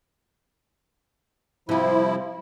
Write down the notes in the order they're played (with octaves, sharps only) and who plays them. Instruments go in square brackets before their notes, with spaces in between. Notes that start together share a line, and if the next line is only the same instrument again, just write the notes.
[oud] C3 G3 [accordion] F3 E4